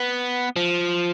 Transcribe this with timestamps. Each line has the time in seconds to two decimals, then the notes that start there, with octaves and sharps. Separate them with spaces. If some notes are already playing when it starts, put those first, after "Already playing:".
Already playing: B3
0.56 F3